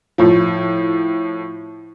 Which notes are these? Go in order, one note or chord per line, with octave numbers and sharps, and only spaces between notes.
A2 F3